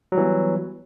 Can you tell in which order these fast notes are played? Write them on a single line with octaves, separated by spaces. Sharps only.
F#3 G3 E3 B3